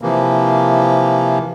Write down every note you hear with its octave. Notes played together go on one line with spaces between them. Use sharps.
C3 E3 F3 A#3